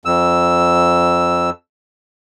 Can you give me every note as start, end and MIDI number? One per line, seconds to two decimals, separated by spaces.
0.05 1.50 41
0.05 1.50 88